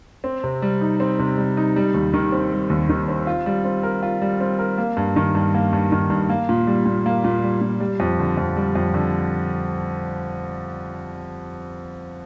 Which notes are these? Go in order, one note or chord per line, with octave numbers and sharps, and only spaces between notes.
C4
C3
G3
D#4
C4
C3
G3
D#4
G3
D#2
D#3
C4
G3
D#2
D#3
C4
F4
G3
C4
A#4
F4
G3
C4
A#4
A#3
G2
D#3
G2
A#3
G2
D#3
G2
A#3
A#2
G3
A#2
A#3
A#2
G3
A#2
G3
F2
D3
F2
G3
F2
D3